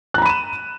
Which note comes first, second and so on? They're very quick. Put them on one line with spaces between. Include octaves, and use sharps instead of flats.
F#6 A#5 B5 D#7 E7